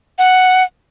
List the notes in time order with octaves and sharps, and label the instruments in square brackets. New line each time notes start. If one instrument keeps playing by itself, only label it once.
[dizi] F#5